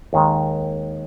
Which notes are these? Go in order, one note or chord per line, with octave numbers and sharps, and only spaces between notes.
D#2 D#3 G#3